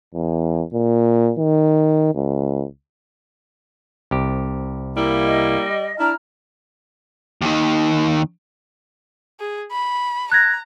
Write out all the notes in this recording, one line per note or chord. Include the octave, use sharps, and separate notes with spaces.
E2
A#2
D#3
C#2
C2 G4
G3 A#3 E4
D#5
D4 E4 A#5 F6
D#2 D#3
G#4
B5
A#5 F#6 G#6 A#6